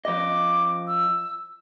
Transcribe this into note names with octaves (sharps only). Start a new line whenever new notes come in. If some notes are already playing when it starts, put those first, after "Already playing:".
F3 D#5 D6
E6